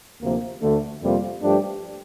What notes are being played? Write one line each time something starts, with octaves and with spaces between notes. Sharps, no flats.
D2 C3 F3 A#3
D2 D3 A3
F2 C3 G3 A#3 F4
G2 F3 A3 D4 G4